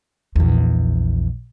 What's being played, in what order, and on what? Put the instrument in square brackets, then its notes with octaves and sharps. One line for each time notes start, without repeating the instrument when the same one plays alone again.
[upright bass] A#1 E2